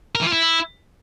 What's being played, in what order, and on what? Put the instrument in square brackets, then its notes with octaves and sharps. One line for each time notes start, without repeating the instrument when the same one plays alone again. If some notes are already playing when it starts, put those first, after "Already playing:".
[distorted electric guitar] A#4
E3
F4
E4